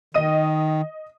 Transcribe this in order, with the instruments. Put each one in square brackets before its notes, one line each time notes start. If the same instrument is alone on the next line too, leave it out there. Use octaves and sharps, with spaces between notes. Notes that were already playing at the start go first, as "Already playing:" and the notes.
[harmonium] D#3 [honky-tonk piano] D#5 D#6 D#7